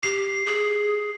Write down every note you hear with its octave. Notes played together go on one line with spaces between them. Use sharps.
G4 C7
G#4